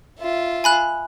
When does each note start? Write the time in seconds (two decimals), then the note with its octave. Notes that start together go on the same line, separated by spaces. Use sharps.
0.20 F4 E5
0.64 G#5 B5 F#6